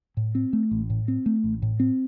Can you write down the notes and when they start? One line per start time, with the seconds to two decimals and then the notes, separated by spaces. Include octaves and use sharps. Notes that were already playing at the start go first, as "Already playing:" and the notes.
0.17 A2
0.35 C4
0.53 A3
0.71 A1
0.90 A2
1.08 C4
1.26 A3
1.44 A1
1.62 A2
1.80 C4